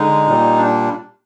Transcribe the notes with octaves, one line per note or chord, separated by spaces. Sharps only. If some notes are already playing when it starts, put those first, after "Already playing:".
Already playing: D3 G#3 D#4
A#2 G3
D4